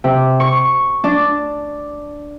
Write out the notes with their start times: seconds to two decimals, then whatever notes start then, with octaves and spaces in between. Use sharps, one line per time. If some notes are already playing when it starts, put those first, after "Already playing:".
0.04 C3
0.40 C#6
1.04 D4